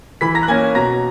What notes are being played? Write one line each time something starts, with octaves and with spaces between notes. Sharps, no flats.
E3 B5 B6
A#5 A#6
F#6
A#3 C#4 G#5 G#6
B2 A#5 A#6